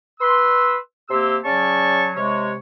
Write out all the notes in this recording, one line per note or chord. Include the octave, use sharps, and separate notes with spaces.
B4 C6 E6
C3 A#3 G4 C6 E6
C#3 F#3 C#4 D5 A5 C#6
C3 G#3 C#5